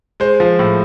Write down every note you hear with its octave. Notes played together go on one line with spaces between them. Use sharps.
G#3 C5
F3
A2